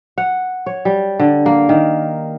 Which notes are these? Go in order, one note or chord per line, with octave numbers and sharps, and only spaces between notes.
F#5
C#5
G3
D3
A#3
D#3